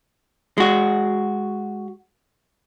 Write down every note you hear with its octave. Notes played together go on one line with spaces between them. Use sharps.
G#3 F#4